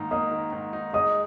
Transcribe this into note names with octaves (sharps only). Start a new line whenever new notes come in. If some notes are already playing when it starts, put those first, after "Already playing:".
Already playing: G#2 D#3 A#3 D#4
A#3 D#5 D#6
D#3
G#2
D#4
G#3 D#5 D#6